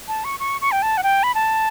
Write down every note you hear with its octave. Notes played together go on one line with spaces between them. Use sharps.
A5
C#6
C#6
C#6
G5
A5
F#5
G5
B5
A5